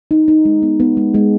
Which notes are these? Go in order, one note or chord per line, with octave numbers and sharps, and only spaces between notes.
D#4
D#4
G#3
B3
B3
G#3
G#3